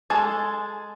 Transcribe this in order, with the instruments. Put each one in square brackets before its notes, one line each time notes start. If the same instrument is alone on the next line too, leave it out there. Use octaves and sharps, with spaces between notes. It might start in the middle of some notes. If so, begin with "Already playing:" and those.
[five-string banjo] G#3 G#4 A4 A5